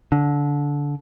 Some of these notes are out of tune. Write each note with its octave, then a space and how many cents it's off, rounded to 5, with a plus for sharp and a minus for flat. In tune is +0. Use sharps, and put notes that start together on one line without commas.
D3 -20